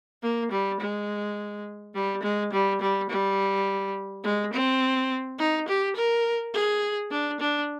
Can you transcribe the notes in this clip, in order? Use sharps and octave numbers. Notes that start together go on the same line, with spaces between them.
A#3
G3
G#3
G3
G#3
G3
G3
G3
G#3
C4
D#4
G4
A#4
G#4
D4
D4